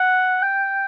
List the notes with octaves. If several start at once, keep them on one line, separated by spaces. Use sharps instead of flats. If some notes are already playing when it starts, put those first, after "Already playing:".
Already playing: F#5
G5